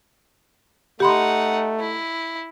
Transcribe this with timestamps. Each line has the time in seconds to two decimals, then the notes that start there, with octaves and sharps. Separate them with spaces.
1.00 A3 D#4 G4 F#5 B5 C6
1.80 E4